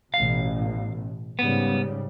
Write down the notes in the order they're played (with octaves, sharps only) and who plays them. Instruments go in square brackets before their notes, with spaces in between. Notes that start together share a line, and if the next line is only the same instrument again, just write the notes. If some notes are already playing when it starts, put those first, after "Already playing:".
[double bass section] A1 B2 [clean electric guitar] F5
[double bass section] G#2 C#3 G3 [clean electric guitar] B3